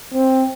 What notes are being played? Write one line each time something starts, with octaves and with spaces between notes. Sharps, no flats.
C4